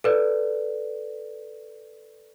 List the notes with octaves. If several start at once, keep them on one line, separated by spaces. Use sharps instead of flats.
A4 B4 D5